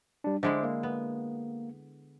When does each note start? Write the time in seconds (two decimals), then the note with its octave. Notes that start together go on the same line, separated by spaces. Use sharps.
0.24 G3 D4
0.43 D3 G#3 E4 C5 E5 D6
0.63 A#3
0.83 B3